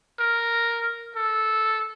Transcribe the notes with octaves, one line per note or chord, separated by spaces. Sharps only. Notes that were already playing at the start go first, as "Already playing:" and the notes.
A#4
A4